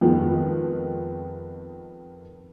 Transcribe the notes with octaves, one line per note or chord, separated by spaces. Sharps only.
F2 D#3 F3 G#3 B3